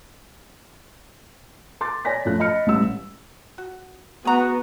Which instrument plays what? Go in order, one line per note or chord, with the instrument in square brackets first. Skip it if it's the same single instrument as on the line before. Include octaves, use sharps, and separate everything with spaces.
[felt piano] C6 D6 A6
C#5 D5 G#5 A#6 B6
F#2 F3 A3 F#6
D#5 B5 F6 C#7
A1 G3 E6
[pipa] F#4
[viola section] B3 [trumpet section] F#4 [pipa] G#4 A#5